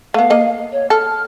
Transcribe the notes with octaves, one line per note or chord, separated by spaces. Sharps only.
A3 B3 F5
A#3 D#5
C#5
A4 F6